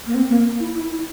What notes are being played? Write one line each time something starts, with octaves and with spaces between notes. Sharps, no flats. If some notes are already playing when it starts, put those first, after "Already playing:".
A#3
C4
A#3
E4
E4
E4